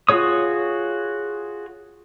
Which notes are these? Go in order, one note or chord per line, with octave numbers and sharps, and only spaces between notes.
F4 F#4 G#4 C#5 D#6